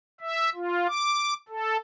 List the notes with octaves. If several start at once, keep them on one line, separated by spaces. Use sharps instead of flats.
E5
F4
D6
A4